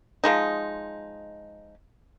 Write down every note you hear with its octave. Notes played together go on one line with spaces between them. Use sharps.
F3 G#3 D#4